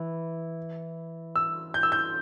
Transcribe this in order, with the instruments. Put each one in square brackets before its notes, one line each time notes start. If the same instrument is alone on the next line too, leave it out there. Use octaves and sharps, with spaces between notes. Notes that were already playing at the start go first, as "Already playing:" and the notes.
Already playing: [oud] E3
[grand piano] E6
G6
E6
G6